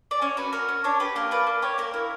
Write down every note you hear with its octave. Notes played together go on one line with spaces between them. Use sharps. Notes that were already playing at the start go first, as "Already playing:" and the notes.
D5
C#4 C#5
F#4 B4
F#4 A#4
C#4
D4 C#5
G4 B4
A#3 A#4
D4 B4
A#3
G4 C#5
A#3 A#4
E4